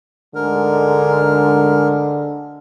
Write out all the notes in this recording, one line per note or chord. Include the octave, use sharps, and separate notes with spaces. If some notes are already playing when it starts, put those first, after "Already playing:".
D2 G#2 D3 G#3 A#4